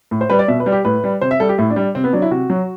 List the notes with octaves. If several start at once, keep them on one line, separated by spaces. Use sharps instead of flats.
A2
C5
G3 B4
D5
B2 E5
B4
G3
G4
A2 B4
G3
C3 C5
E5
G3 A4
G4
A2 E4
D4
G3
C3 C4
B3
F#3 D4
E4
C3 F#4
F#3